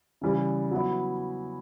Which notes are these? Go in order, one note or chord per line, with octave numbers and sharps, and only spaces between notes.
C#3 E3 G3
F#3 B3 E4